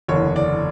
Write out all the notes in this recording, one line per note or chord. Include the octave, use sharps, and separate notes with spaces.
F#1 E2 D3 C#5
D5